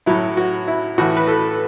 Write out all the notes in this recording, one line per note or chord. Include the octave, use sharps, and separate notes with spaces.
A2 F#3 E4
F#4
E4
A2 E3 F#4
B4
A4